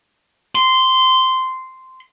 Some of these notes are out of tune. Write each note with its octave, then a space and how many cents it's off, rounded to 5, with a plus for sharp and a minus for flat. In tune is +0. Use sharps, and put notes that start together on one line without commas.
C6 -10